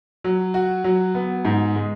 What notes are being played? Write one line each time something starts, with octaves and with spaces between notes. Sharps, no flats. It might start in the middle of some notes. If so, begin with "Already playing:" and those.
F#3
F#4
F#3
B3
G#2
G#3